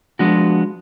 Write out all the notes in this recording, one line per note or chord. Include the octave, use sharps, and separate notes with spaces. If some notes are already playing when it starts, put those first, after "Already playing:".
F3 G#3 B3 D4 F#4